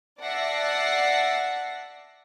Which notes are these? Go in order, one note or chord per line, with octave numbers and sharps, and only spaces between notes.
D5 E5 F#5 A5 A#6 C7